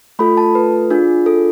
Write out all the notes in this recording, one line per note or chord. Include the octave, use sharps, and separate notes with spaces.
A3 F4 A4 B5
A5
B4
D4 F4 G#4
A4